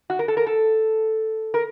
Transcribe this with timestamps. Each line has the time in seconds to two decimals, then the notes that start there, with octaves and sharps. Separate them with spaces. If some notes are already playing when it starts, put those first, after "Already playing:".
0.10 F#4
0.19 A#4
0.28 A4
0.37 A#4
0.47 A4
1.54 A#4